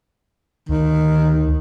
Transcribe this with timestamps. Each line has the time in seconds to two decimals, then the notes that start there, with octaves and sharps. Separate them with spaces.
0.69 D2 D#3